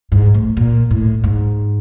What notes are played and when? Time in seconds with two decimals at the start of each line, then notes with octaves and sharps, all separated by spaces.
0.12 G#2
0.34 A2
0.57 A#2
0.91 A2
1.24 G#2